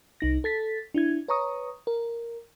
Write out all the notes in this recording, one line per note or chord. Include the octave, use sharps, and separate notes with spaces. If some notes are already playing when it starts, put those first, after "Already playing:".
C2 D#4 A#6
A4 A6 B6
D4 E4 G#6
B4 C#5 A#5 C#6 D#6
A#4